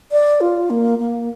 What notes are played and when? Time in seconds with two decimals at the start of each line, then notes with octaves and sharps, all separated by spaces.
0.12 D5
0.41 F4
0.70 A#3
0.99 A#3